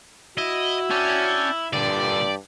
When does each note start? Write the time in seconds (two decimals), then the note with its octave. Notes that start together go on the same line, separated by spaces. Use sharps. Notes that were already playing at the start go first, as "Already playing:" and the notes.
0.38 E4 F#4 D#5
0.90 C#4 D4 D5 G5
1.73 G2 A#2 D3 G4 D5